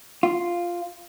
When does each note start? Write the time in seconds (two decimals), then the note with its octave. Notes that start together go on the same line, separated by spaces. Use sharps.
0.23 F4